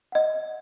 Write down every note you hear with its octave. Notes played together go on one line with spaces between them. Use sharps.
D#5 F#5